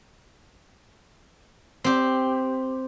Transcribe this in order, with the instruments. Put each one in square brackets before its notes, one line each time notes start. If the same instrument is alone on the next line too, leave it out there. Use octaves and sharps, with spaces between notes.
[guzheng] C4 G4